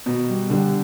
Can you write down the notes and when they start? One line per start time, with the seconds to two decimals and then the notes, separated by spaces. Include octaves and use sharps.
0.06 B2 D#3
0.29 G3
0.50 D3 G3